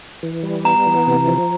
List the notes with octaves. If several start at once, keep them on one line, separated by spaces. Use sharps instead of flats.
E3
G3
B3 A#5
E3
C3
F3